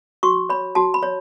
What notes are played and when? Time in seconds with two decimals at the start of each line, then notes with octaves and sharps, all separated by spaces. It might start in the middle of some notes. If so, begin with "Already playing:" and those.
0.23 F#4 C#6
0.49 C#5 B5
0.75 F#4 A5
0.94 B5
1.03 C#5